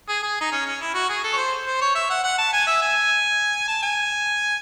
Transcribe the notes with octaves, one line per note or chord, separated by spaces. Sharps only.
G#4
G#4
D#4
C#4
C#4
E4
F#4
G#4
A4
C#5
C5
C5
C#5
E5
F#5
F#5
A5
G#5
E5
G#5
A5
G#5